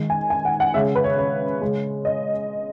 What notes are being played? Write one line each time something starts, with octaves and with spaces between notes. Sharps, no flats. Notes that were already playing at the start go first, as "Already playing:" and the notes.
Already playing: D#3 G#3
G#5
G#5
F#5
F#5
C#3 G#3 E5
B4
C#5
C#5
C#3 G#3
D#5